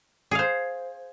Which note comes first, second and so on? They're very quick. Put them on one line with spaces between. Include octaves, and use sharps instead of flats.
G#4 F5 C5